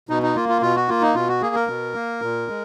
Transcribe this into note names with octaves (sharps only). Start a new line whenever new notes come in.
B2 D#4
D#4
A#3 F4
F4
B2 F4
F#4
A#3 F4
D#4
B2 F4
F#4
A#3 G#4
A#4
B2
A#3
A#2
G#3